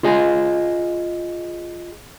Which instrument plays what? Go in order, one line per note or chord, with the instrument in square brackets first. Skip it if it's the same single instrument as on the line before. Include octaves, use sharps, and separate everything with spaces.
[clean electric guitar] F4 G#4 D#5 G#5